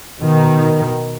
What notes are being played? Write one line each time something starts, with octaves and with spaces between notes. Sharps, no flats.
B2 D#3